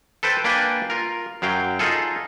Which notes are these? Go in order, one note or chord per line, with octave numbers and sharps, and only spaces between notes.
A4 B4 C5 G5 A5
A#3 D4 B4 D5 G5 G#5
F4 A#4
F#2 F#3 F5 G5
D#4 F4 G#4 A4